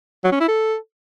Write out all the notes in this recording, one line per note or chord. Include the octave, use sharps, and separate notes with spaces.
F#3
C#4
E4
A4